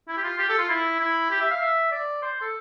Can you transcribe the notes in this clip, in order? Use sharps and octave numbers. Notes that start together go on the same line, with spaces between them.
E4
G4
F4
G4
A4
F4
E4
E4
G4
E5
F5
E5
D5
C5
A4